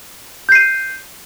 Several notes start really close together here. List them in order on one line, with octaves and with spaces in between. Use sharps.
G6 C7 D#7